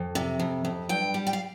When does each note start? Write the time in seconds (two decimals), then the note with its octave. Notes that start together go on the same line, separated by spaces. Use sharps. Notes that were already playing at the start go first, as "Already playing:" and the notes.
Already playing: F2
0.15 C3
0.40 F2
0.65 F2
0.89 G2 G5
1.14 G3
1.27 G5
1.33 F5